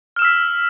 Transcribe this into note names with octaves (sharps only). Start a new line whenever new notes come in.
E6 F6 B6 E7